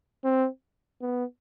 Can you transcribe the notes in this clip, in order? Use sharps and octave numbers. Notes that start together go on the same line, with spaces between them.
C4
B3